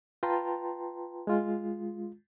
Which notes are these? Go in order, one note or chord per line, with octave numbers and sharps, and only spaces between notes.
F4 B4 G5 A5 A#5 C6
G#3 F4